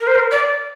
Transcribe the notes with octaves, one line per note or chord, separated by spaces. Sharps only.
A#4
C5
A#4
D5